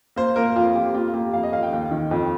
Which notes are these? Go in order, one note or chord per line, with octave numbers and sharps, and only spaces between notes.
A#3 C5
A#3 A#4
F2 F4
F2 G4
A#3 F4
A#3 G4
F2 F5
D#5
F2 F5
G5
D#2
D#3
F2